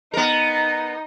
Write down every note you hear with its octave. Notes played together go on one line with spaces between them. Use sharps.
B3 D#4 A#4